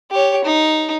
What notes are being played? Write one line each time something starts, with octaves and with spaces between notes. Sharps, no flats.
G4 C#5
D#4